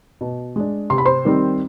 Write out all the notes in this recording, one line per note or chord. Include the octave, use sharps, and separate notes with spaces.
B2
G#3 D4
C3 C6
B5
C5 C6
D#3 G3 C4